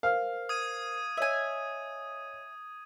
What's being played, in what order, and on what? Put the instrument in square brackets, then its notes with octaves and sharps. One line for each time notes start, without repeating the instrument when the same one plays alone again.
[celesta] A#4 C5 F6 [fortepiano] F5
[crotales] D#6 G#6 D#7
[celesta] C#5 D#5 [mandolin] E5 G#5